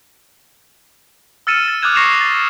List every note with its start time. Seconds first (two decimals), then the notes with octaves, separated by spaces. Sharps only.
1.47 E6 F6 A6 C#7 D#7 E7
1.68 A6
1.82 D6 D#6 F6 F#6 G#6 E7
1.95 C#6 A#6 C7 C#7 E7 F7
2.21 A6